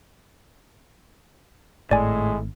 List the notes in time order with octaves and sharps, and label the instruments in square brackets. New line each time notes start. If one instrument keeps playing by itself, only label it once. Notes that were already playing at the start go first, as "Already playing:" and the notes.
[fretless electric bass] G#1 [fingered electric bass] A2 [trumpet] G#3 [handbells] D5 G#5